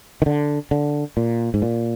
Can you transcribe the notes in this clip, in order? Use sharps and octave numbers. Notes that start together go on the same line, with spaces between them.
D#3
D3
D3
A#2
G#2
A#2